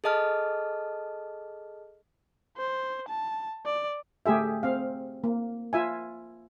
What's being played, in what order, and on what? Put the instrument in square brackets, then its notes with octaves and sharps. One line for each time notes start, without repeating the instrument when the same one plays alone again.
[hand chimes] G#4 A4 D#5 A5 F6
[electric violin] C5
A5
D5
[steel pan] A3 G4 G#4 E5
C4 F5
A#3
F4 E5 G#5